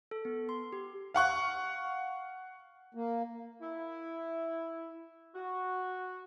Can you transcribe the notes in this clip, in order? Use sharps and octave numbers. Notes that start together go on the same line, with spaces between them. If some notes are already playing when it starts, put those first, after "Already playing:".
A4
B3
C6
G4
F5 F#5 C#6 F#6
A#3
E4
F#4